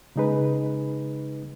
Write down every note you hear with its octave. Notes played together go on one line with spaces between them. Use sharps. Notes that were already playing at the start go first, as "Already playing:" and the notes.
C#3 G#3 D#4 G#4 B4